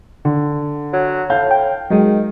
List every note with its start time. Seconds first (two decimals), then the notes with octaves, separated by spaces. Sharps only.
0.25 D3
0.93 F#3
1.30 A2 F5 A5 G6
1.51 G5
1.90 D#3 F#3 G#3